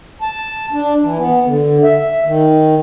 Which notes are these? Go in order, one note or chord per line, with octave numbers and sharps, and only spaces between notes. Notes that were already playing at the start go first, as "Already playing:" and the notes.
A5
D4
E3
B3
D3
E5
D#3